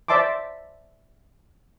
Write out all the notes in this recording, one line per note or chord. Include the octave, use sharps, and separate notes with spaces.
C5 D5 E5 A5 C6 D6